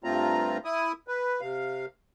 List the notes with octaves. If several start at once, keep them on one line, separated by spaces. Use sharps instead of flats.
G2 A3 C4 F4 A#5
E4 D#6
B4
C3 F5